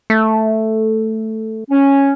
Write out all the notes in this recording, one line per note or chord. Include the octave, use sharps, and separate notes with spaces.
A3
C#4